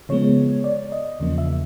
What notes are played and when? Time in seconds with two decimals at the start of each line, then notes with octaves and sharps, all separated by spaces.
0.09 C#3 F3 G#3 B3 C#5
0.64 D5
0.92 D#5
1.20 E2 C#3 F3 A#3
1.38 E5